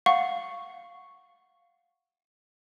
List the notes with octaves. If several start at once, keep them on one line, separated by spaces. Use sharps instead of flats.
F5 F#5 C#6